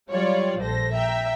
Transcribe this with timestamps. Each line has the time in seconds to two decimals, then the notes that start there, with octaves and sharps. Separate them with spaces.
0.10 F#3 G3 F4 C#5 D5
0.60 A#1 A4 C5 A#6
0.93 E5 G5 A#5